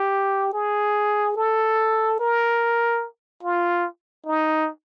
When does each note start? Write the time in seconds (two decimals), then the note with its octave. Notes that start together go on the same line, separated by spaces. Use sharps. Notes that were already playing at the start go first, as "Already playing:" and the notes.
Already playing: G4
0.53 G#4
1.36 A4
2.19 A#4
3.43 F4
4.26 D#4